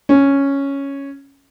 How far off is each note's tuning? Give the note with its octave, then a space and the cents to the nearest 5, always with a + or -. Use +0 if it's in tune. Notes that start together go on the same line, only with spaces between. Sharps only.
C#4 +0